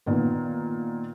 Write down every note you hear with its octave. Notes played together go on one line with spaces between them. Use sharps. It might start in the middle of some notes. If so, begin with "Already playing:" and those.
A#2 D#3 B3